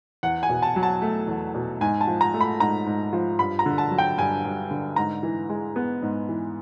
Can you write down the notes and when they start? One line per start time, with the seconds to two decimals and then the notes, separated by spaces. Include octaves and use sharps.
0.23 E2 F#5
0.43 G#5
0.49 B2
0.62 A5
0.76 F#3
0.83 A5
1.02 A3
1.28 E2
1.55 B2
1.81 G#2 G#5
2.01 A5
2.07 F3
2.21 A#5
2.34 A3
2.41 B5
2.60 G#2 A#5
2.86 G#2
3.13 F3
3.39 G2 B5
3.59 A#5
3.66 D3
3.78 A5
3.91 F#3
3.98 G5
4.18 G2 G#5
4.45 G2
4.71 D3
4.96 G#2 A#5
5.23 E3
5.49 G#3
5.76 B3
6.03 G#2
6.29 E3